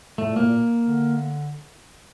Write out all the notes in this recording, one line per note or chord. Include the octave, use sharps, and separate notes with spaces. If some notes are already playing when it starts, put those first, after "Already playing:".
A2 A3
A#2
A2 A#3
A#2
D3